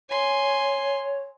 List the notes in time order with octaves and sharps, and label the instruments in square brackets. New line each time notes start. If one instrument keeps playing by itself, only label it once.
[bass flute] C#5 [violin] G#5 C6